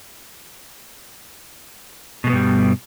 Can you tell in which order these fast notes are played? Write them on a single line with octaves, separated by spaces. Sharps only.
B2 G#3 B3 G2 G3